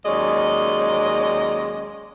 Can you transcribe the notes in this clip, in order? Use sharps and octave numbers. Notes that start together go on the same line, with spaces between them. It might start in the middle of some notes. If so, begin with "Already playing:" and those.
D#2 F#3 G#3 C#4 D5 D#5